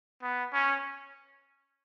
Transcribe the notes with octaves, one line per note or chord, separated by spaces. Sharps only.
B3
C#4